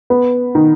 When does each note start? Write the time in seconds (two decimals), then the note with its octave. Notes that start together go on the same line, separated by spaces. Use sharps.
0.10 B3
0.55 D#3